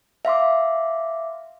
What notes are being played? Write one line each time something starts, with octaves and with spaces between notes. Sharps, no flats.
E5 F5 C6 D6